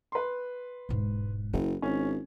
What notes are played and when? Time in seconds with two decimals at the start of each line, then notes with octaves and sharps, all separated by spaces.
0.12 B4 C6
0.89 E1 G#2
1.53 F#1 E4
1.82 G#1 C#4